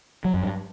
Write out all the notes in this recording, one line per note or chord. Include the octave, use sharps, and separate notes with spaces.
F#3
F#2
G2